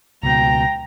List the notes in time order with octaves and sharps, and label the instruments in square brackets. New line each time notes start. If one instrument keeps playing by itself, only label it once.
[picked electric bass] C#2 B2 [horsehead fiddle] G5 A#5